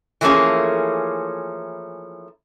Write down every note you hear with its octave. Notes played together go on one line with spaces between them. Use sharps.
E3 F3 A3 A#3 C#4 G#4